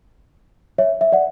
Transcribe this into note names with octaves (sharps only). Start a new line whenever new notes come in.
C#5 E5
E5
D5 F#5